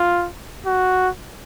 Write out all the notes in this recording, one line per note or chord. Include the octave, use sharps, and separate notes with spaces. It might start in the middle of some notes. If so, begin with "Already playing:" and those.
Already playing: F4
F#4